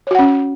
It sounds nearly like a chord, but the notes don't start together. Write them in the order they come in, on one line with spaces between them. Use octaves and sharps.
C#5 F#4 F#5 C#4